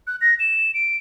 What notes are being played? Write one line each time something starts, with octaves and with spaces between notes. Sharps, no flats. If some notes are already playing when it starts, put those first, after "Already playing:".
F#6
A#6
E7
D7